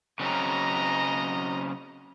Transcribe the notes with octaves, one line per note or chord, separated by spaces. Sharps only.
C#3 F#3 C4 D#5 A#5